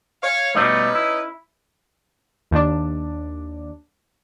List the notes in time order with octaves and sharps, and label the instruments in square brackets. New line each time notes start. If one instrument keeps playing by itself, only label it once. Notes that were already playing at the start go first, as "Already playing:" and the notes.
[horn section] C#5 F5
[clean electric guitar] B2 G3 A3 [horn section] C#4 D#4 B4
[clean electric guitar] E4
[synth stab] D#2 D4